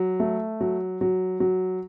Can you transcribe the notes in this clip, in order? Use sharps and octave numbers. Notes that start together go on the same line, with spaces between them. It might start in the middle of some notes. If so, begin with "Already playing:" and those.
Already playing: F#3
A3
F#3
F#3
F#3